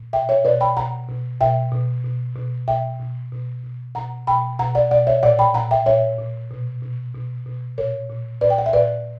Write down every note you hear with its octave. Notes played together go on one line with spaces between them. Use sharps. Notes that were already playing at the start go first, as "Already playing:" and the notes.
Already playing: A#2
B2 E5 G5
C#5 E5
B2 B4 D5
G5 B5
B2 F#5 A#5
B2
B2 E5 G5
B2
B2
B2
B2 E5 G5
B2
B2
B2
B2 F#5 A#5
B2 G5 B5
B2 F#5 A#5
D5 F#5
B2 D5 F#5
C#5 E5
A#2 D5 F#5
G5 B5
A#2 F#5 A#5
E5 G5
A#2 C#5 E5
A#2
B2
B2
B2
B2
A#2 A#4 C#5
A#2
A#2 B4 D5
G5
F#5
E5
A#2 B4 D5